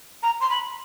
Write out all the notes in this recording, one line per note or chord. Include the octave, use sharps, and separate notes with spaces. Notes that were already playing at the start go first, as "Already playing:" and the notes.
A#5
C6
B5